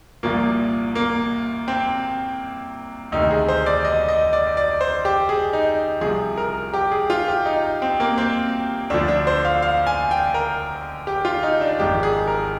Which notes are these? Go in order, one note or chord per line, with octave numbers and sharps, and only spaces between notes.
C2 A#2 F3 A#3
A#3
C4
D2 C3 D#3 D#4
G#4
C5
D5
D#5
D#5
D5
D5
C5
G4
G#4
D#4
C2 C3 F3 G#4
A#4
G4
G#4
F4
G4
D#4
C4
A#3
C4
D2 D3 F3 D4
D4
C5
F5
F5
G#5
G5
A#4
G4
F4
D#4
D4
G#1 G#2 F3 G4
G#4
A#4